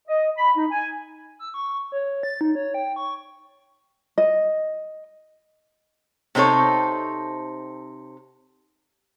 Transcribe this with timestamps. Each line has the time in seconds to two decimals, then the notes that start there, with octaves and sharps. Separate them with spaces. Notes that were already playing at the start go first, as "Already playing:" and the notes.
0.08 D#5
0.38 B5
0.57 D#4
0.71 G#5
1.39 E6
1.54 C#6
1.92 C#5
2.23 A6
2.41 D#4
2.55 C#5
2.74 G5
2.96 C#6
4.18 D#5
6.35 C3 C4 D#4 A4 C#5